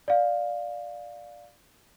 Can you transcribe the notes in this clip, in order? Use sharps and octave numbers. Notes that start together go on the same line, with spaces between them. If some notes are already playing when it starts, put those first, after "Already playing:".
D5 F5